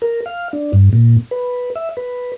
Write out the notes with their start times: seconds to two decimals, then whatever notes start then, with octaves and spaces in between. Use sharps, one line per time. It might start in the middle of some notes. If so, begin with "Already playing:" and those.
0.02 A#4
0.26 F5
0.53 D4
0.73 G2
0.93 A#2
1.31 B4
1.75 E5
1.97 B4